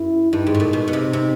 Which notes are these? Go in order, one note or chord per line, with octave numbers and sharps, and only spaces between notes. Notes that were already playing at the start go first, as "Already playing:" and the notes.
Already playing: F#2 E4
G2 D#4
G#2
A2
A#2
B2
B2
C3
C3